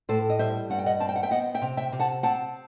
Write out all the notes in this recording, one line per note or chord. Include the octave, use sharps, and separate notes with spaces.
A2 A4 C5
D#5
G3 C5 E5
G2 F#5
G5
D#5 F#5
C4 A5
G5
F#5
E5 G5
B3 D#5 F#5
E5 G5
C3
E5 G5
C3
F#5 A5
C4 F#5 A5